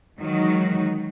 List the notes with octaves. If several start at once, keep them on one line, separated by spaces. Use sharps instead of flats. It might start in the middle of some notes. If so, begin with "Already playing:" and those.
D#3 E3 F#3 G#3 D#4 F#4